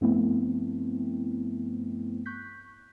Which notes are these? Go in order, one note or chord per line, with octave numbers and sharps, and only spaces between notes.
G2 F3 A3 B3 C4 E4
C#6 F#6 G6 B6